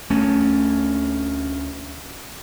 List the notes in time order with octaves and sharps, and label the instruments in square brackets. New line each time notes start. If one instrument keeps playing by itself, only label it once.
[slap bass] D2 A3 C#4